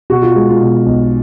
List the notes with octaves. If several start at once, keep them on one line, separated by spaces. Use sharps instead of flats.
B2 F#4
F4
G#3
F4
B2
B1